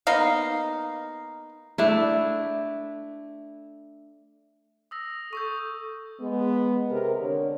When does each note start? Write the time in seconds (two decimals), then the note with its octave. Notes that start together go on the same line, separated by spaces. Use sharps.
0.07 A#3 B3 D#4 F5
1.78 A3 D4 E4
4.91 D#6 E6 A#6
5.33 A4 C#6 D#6 G6
6.20 G#3 B3
6.90 C3 A#4
7.20 D3 C#5